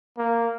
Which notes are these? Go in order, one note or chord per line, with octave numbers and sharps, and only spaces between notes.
A#3